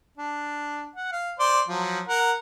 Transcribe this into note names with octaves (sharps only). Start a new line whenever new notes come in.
D4
F#5
F5
C5 D5 C6
F3 F#3
A#4 F#5